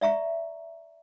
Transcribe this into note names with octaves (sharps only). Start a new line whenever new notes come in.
D5 E5 A#5 C#6